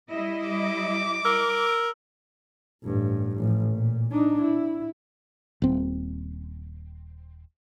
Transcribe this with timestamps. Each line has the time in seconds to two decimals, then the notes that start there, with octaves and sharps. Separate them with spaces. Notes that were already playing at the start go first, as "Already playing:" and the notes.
0.13 G3 E4 D#5
0.48 D6
1.25 A#4 E6
2.83 A1 G2
3.37 A1 F3
3.70 A#2
4.11 D4 D#4
4.42 E4
5.62 D#1 C4